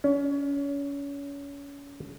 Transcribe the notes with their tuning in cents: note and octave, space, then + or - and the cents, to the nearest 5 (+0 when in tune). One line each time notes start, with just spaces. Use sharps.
C#4 +30